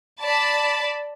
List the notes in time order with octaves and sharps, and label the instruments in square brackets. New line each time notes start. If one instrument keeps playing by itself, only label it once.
[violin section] D5 A5 B5